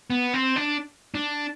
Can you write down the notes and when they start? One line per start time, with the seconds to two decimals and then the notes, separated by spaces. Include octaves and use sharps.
0.10 B3
0.34 C4
0.56 D4
1.15 D4